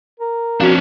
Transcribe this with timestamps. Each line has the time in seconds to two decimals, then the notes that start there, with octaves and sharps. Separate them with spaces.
0.20 A#4
0.61 F2 C#4 D4 F#4 F5